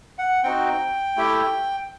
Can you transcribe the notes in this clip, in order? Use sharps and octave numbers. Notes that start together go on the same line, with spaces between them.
F#5
C4 D#4 F#4 G5
A3 E4 G4